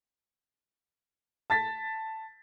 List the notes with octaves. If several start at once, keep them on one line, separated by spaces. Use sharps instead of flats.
A5 A6 B6